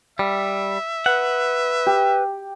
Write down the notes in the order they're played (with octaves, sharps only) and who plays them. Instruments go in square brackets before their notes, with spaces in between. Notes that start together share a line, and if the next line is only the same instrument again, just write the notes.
[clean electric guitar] G3 [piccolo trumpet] E5
[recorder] B4 [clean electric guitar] F#5
[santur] G4